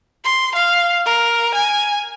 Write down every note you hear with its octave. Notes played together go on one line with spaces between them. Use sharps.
C6
F5
A#4
G#5